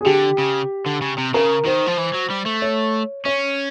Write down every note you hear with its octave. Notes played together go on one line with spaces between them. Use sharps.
G#4
D3 G4
C#3
D3
C#3
C3
C#3 A#4
D#3 C5
F3
E3
F#3
G3
A3
C#5
C#4 C#5